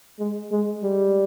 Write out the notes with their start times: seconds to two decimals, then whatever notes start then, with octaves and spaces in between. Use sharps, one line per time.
0.19 G#3
0.51 G#3
0.83 G3